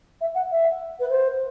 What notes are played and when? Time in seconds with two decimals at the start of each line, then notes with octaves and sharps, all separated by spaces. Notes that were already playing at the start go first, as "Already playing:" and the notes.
0.21 E5
0.35 F#5
0.50 E5
1.00 B4
1.09 C5